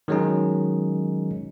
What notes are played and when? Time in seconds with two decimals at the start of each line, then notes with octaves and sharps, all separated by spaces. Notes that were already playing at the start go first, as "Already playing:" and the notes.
0.08 D#3 F#3 G#3 C#4 D#4